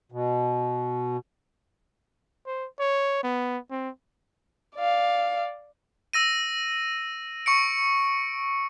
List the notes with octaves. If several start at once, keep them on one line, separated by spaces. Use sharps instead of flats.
B2
C5
C#5
B3
C4
D5 F5
E6 A#6 D#7
C#6 C#7 D7